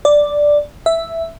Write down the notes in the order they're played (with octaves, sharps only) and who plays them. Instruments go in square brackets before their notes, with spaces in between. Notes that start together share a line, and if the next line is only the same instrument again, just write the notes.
[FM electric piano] D5
E5